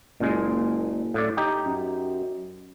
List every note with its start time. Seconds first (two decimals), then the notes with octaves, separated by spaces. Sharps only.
0.20 F#1 A#2 G#3
1.14 A2 D5
1.37 D#4 G4
1.66 F#2